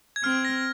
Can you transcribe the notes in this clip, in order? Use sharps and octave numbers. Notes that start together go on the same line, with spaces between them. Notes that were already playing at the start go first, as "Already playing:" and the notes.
G#6
C4 F6
A#6